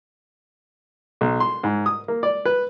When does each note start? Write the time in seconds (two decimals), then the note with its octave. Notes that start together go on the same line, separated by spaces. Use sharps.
1.21 B1
1.40 C6
1.64 G#2
1.86 D#6
2.08 A#3
2.23 D5
2.45 B4